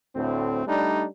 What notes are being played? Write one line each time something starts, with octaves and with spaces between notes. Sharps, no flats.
D2 A2 C4
G3 A3 D4 D#4